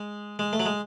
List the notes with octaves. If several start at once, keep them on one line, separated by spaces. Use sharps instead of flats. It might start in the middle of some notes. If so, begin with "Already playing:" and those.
Already playing: G#3
G#3
A3
F#3
G#3